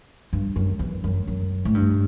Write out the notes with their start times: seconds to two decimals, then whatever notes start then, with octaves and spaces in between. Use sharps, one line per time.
0.33 G2
0.56 F#2
0.79 E2
1.04 F#2
1.27 F#2
1.65 A2
1.74 G2